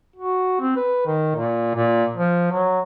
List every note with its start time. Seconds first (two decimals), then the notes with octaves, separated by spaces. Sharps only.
0.16 F#4
0.60 C4
0.76 B4
1.06 D#3
1.36 A#2
1.75 A#2
2.17 F3
2.52 F#3